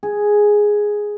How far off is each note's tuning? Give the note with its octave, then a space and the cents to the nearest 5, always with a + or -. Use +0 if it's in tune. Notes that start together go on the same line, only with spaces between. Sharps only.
G#4 +0